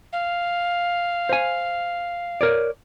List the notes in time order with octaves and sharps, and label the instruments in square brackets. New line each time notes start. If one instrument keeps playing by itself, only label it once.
[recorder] F5
[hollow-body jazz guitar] C5 G#5
A#4 C#5 D5